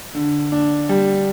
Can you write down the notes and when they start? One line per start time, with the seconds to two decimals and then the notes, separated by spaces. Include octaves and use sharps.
0.15 D3
0.52 D4
0.89 G3